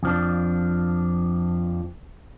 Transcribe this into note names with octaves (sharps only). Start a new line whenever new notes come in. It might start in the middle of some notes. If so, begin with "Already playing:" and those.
F2 F3 D4